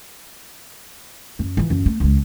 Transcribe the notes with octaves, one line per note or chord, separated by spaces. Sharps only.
F#2
E3 F3
F#2
A3
C#2 G#3